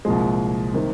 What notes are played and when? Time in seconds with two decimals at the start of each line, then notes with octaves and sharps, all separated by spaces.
0.05 C2 A#2 F3 G#3
0.74 C3 D#3 G3 A#3